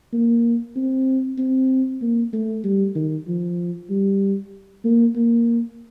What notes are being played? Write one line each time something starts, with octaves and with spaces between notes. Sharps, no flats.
A#3
C4
C4
A#3
A3
G3
D#3
F3
G3
A#3
A#3